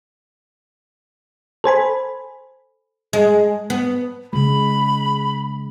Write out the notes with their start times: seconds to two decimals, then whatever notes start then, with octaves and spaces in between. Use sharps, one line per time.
1.64 A4 C5 G#5 B5
3.13 G#3
3.70 B3
4.33 C#3 G#3 B5